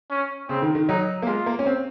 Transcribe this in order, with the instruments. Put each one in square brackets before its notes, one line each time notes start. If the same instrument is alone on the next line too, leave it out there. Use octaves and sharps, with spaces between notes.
[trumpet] C#4
[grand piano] C#3 [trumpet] C4
[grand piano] D#3
D#3
[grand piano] F#3 [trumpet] D#4
[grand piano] A#3
[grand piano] G#3 [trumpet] F4
[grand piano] A#3
C#4
C4